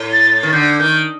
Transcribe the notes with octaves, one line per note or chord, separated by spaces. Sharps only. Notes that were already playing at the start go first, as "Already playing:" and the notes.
Already playing: A2
A6
A6
D#3
D3 G6
D#3 G6